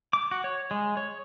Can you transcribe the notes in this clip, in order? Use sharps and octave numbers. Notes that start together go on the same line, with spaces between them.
D6
F#4
C#5
G#3
C#5